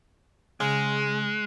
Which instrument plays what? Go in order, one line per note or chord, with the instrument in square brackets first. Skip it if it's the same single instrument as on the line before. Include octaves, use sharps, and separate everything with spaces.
[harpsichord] C#3 [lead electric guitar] G#3